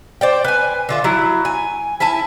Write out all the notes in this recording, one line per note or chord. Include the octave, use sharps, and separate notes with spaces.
C5 D5 G5
B4 G#5
D3 F4 E5
F#3 E4
G#5
E4 E5 G#5 A5